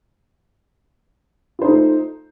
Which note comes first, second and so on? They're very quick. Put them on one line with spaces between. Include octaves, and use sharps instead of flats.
F4 C5 D#4 A3